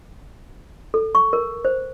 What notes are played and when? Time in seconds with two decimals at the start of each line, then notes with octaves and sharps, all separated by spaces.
0.94 A4
1.15 C#6
1.33 A#4
1.65 C5